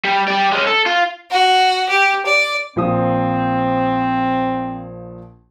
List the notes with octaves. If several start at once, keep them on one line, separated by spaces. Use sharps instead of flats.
G3
G4 D5
G#3 C#4
A4
F4
F#4
G4
D5
A#1 F3 C4 D#6